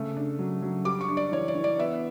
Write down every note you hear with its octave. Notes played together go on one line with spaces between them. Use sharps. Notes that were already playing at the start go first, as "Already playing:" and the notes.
Already playing: C#3 A3
D4
F#3
F#3
G3 D6
C#6
D4
D5
E3 C#5
D5
E3
D5
B3 E5